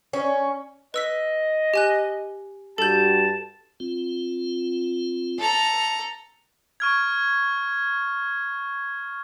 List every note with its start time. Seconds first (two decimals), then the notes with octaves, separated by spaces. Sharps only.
0.13 C#4
0.94 B4 D#5 E6 B6
1.74 G4 G#5 F#6
2.78 G2 F#4 G4 A4 A5 G6
3.80 C4 F4
5.38 A4 A#5
6.80 C#6 F6 G#6